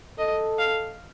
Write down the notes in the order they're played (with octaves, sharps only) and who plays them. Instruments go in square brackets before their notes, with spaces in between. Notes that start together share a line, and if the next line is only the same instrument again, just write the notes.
[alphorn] A4 [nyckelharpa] D#5
[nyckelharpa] F5